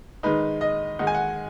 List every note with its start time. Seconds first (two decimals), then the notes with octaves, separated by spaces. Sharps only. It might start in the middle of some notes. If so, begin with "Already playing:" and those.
0.23 D#3 G#3 D#4 B4
0.61 D#5
0.99 D#3 G#3 D#4 F#5
1.07 G#5
1.15 F#5